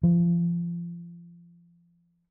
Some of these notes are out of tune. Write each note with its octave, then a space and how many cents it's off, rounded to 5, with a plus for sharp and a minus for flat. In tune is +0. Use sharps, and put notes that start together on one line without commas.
F3 -30